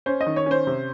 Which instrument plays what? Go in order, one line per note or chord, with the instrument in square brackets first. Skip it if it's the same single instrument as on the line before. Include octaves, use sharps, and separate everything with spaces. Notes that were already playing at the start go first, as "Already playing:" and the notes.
[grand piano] C#4 C5
D#5
D#3
C#5
C#4 C5
C3